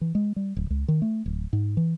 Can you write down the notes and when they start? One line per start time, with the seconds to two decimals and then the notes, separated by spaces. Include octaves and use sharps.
0.01 E3
0.15 G#3
0.36 G3
0.56 D1
0.70 C#2
0.88 D#3
1.02 A3
1.26 D1
1.53 G#2
1.77 E3